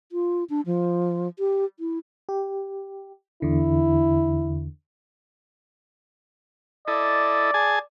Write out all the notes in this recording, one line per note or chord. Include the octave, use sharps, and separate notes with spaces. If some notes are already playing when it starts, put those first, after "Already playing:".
F4
D4
F3
G4
E4
G4
E2 D3 E4
E4 A4 D5 D#5
G#4 G#5 A5